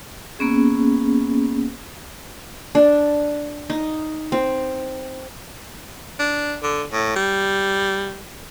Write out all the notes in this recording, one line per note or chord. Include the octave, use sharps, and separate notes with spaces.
A#3 B3 C#4 G#4
D4
D#4
C4
D4
D3
A2
G3